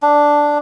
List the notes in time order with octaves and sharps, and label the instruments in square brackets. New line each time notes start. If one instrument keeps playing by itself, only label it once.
[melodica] D4